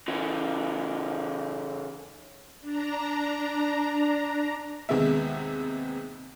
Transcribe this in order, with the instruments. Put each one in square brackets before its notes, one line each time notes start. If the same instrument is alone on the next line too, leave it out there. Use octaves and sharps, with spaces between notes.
[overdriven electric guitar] C#3 E3
[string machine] D4 A#5
[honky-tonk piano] D#2 C3 G#3 B3 E5